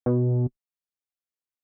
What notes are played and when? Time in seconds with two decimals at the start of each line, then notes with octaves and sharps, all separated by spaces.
0.06 B2